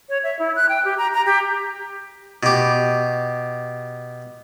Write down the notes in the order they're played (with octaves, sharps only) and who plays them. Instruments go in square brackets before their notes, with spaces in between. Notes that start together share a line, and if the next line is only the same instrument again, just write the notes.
[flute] C#5
E5
E4
F#6
G5
G4
A#5
A#5
G4
[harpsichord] B2 G4